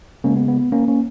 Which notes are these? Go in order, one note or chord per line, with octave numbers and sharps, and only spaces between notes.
C#3 G#3 A#3 C#4
B3
B3
B3
A#3 C#4
A#3 C#4